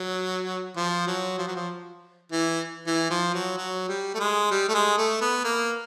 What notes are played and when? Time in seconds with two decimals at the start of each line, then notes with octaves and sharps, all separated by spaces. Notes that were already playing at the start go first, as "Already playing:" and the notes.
Already playing: F#3
0.77 F3
1.08 F#3
1.38 F3
1.47 F#3
1.56 F3
2.32 E3
2.87 E3
3.10 F3
3.34 F#3
3.57 F#3
3.89 G3
4.15 A3
4.20 G#3
4.51 G3
4.69 A3
4.74 G#3
4.98 A3
5.21 B3
5.44 A#3